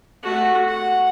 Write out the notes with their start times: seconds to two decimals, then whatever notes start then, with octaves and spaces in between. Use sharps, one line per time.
0.23 A3 F#4
0.68 F#5